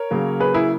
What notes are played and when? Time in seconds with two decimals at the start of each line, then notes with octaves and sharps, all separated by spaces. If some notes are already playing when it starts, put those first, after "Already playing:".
Already playing: A#4 C#5
0.11 C#3 F#3 A#3
0.40 G#4 B4
0.54 E4 G#4